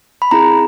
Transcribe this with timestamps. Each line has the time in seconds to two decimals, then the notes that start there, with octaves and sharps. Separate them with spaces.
0.22 B5
0.31 C4 E4 G#4 A#5